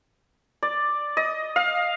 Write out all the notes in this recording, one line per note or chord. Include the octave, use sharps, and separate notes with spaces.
D5
D#5
F5